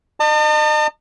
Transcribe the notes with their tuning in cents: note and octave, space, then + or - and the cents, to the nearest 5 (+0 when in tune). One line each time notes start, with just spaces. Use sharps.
D#5 -40 A5 +40